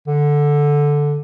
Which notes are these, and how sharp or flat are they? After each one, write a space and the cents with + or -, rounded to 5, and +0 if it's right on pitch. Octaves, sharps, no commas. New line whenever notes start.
D3 -5